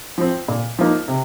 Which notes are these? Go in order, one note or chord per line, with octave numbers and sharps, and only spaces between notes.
F3 C4
A#2
F3 A#3 D#4
C3